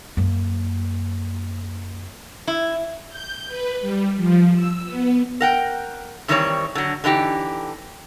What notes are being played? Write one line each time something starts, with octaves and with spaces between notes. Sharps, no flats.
F#2 A#3
E4
G6
B4
G3
F3
E6
B3
A#4 F#5 G5
G2 D#3 E3 G3 C4 C#5
D3 F#3
D3 E3 D#4 G4